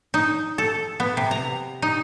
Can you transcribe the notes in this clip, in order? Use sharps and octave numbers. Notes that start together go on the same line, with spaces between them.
D#4
A4
B3
C3
A#5
D#4